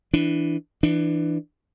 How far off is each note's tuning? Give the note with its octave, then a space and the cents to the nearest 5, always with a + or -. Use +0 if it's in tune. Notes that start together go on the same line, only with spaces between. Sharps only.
E3 +0 D4 +0
E3 +5 D4 +20